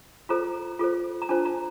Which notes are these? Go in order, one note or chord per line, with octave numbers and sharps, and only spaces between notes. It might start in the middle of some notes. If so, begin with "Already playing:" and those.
F4 A4 C5 A#5
F4 A4 C5
A#5
D4 F4 C5 A5
A#5